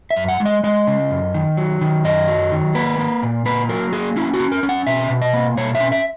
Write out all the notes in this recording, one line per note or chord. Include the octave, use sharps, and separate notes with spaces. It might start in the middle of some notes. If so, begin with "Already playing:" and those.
E5
F#2
F#5
G#3
D#5
G#3 D#5
C#3
F#2
D#3
F#3
D#3
F#2 D#5
F#3
D#3
A#3 B4
A#3
A#2
A#3 B4
F#3 A#4
A#3 G#4
C#4 E4
F#4
C#4
A#4
C#4
F#5
B2 E5
B2
D#5
A#3
B2 C#5
E5
C#4
E5